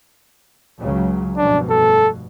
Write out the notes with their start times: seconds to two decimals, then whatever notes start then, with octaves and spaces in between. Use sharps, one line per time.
0.78 C#2 C#3 F#3
1.38 F1 G2 B2 D4
1.70 A4